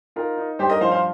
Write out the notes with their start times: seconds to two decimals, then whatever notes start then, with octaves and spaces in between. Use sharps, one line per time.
0.16 D#4 F4 A#4
0.37 D#4
0.59 G2 G4 C5
0.70 A#4 D#5
0.81 F3 C5 F5
0.91 C5 F5